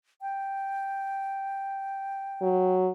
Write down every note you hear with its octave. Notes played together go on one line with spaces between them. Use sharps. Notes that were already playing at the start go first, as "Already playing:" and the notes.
G5
F#3